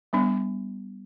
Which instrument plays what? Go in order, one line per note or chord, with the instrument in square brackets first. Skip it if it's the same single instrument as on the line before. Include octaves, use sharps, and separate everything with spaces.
[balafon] G3 B3 D4